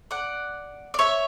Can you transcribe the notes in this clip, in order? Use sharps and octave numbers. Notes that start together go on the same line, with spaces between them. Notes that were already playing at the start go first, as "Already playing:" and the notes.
D5 F#5
D5
C#5 E5